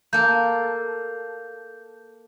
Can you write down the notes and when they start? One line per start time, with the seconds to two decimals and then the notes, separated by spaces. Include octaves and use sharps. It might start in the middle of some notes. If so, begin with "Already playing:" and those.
0.13 A#3 A4 G6